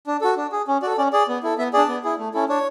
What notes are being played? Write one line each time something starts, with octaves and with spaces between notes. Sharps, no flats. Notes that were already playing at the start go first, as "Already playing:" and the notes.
D4
F#4 A4
D4
G#4
C#4
F#4 A4 D5
C#4 D5
G#4 D5
B3
E4 A4
B3 E5
D4 G#4 D5
B3
E4 G#4
A3
C#4 E4 A4
D4 C#5